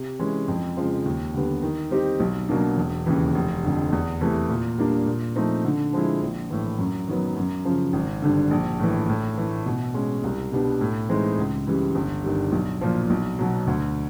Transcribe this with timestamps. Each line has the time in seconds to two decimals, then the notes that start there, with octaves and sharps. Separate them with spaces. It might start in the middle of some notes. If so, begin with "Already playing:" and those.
Already playing: C3
0.19 E3 G#3 C#4
0.48 F2
0.77 C#3 F3 G#3
1.05 D#2
1.34 D3 G3 B3
1.63 D#3
1.91 G3 C4 D#4 G4
2.20 B1
2.49 B2 F#3 A#3 D4
2.77 E1
3.06 D#2 C#3 E3
3.35 F1
3.63 F2 D3
3.92 E2
4.21 C3 E3 A3
4.49 A#2
4.78 G3 A#3 D4
5.06 A#2
5.36 F3 A3 C4 D#4
5.65 D3
5.93 F3 G#3 C4 E4
6.22 A#1
6.50 A2 E3
6.79 F#2
7.07 D#3 F#3 B3
7.36 F#2
7.65 C#3 F3
7.93 G#1
8.22 G2 D3
8.51 A#1
8.79 A2 E3
9.09 A2
9.37 E3 A3
9.66 B2
9.94 G#3 C#4
10.24 C2
10.52 B2 G3 B3 D4
10.81 A2
11.09 E3 G#3 C4 D#4
11.38 C#2
11.67 C#3 E3 G3
11.95 G1
12.24 G2 D#3 G3
12.52 B1
12.81 A#2 F3
13.10 B1
13.39 B2 F#3
13.67 D2